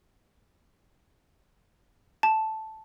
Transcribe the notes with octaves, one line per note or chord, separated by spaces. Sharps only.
A5